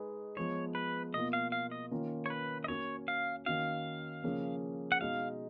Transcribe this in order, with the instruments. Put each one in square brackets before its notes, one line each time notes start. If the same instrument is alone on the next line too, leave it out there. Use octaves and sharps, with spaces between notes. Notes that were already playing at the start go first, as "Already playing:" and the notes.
Already playing: [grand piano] G#3 D#4 G#4 B4
[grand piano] F3 G#3 B3 [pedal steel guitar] C#5
[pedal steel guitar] B4
[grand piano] B2 A#3 F4 [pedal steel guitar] D#5
[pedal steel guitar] F5
F5
D#5
[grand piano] D#3 A#3 C#4 F4 A#4
[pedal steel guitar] C#5
B4
D#5
[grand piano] A#3 C#4 F#4 A#4 [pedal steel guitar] C#5
[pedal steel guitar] F5
[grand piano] D#3 A#3 C#4 F#4 [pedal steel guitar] F5
[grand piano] C#3 F3 A#3 C#4 G#4
[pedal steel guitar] F#5
[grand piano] B2 G#3 D#4 F#4 [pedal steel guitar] F5